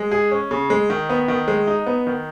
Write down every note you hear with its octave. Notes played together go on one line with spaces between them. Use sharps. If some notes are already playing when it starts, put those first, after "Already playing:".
Already playing: G#3
G#4
C#4
C#3
G#3
D#3
B3
D#3
G#3
D#4
B3
D#3